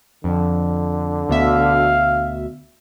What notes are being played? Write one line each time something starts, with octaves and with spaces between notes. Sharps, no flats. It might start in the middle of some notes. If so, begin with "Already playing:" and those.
F2 D3
D2 B2 E5 F5